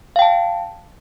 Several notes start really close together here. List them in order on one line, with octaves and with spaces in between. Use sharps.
F5 G5 A5